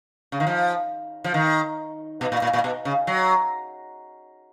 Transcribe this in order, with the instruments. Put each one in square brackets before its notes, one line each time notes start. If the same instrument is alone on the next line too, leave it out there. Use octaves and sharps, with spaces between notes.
[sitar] C#3
D#3
F3
F3
D#3
B2
A#2
A#2
A#2
B2
C#3
F#3